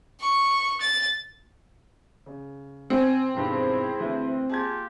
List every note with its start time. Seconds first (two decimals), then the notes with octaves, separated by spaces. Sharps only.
0.21 C#6
0.81 A6
2.26 C#3
2.90 C4 G#5
3.34 E1 G2 D#3 E4 G#4 C5
4.00 D2 E3
4.49 A#3 F4 G4 G#4 A5 G#6